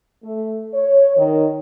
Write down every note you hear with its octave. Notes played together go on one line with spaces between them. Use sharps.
A3
C#5
D#3